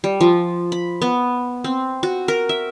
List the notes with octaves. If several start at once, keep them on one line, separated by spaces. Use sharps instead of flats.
G3
F3
B5
B3
C4
F#4
A#4
E5